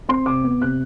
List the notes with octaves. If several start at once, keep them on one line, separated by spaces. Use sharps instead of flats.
C4 C6
C3 D6
B3
C3 F#6